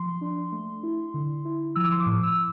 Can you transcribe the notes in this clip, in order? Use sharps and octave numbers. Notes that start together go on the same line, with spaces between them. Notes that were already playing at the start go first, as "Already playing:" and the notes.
Already playing: F3 C6
D4
A3
E4
D3
E4
F3 E6
D6
C6
D6
A2
E6